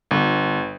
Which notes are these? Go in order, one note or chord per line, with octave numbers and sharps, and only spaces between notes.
G1